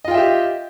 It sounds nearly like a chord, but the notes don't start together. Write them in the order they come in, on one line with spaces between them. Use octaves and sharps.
D#5 F4 G5 E5 G4